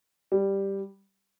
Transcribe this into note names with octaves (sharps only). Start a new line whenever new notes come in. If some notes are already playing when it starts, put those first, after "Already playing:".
G3